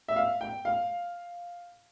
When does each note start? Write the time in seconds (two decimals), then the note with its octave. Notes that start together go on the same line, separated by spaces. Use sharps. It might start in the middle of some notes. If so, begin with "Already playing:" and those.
0.08 E5
0.16 F5
0.41 G5
0.65 F5